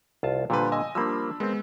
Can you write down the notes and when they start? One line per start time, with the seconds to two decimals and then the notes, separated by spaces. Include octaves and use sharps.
0.23 C2 F4 A5
0.50 A#2 D3 F3 G3 G4 B4
0.72 D#5 G#5 E6
0.95 F3 G3 A#3 D4 B5 E6
1.40 G#3 B3 C4 A#4